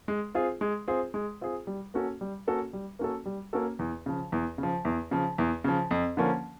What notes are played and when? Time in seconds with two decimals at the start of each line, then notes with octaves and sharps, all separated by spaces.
0.08 G#3
0.35 C4 F4 G#4
0.61 G#3
0.88 C4 F4 G#4
1.14 G#3
1.41 C4 F4 G#4
1.67 G3
1.94 A#3 C#4 F#4 A4
2.21 G3
2.47 A#3 C#4 F#4 A4
2.73 G3
2.99 A#3 C#4 F#4 A4
3.26 G3
3.53 A#3 C#4 F#4 A4
3.79 E2
4.06 C#3 F3
4.32 E2
4.58 C#3
4.63 F3
4.85 E2
5.11 C#3 F3
5.38 E2
5.64 C#3 F3
5.91 F2
6.17 D3 F3 A#3 C#4